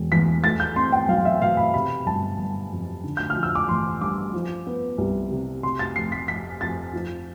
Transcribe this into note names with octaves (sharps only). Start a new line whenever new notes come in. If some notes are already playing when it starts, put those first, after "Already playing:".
Already playing: E1
E2 B6
A3 A6
G6
C4 C6
G5
B1 F5
E5
B2 F5
B5
C3 B5
G1 A5
G1
F2
D3
G6
F6
F3
E6
D6
A1 C6
G2 D6
F3
B3
C2
C3
C3 C6
A6
F1 C7
B6
F1 B6
F2 A6
F3